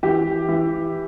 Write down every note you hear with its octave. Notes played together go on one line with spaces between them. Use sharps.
E3 G4
E3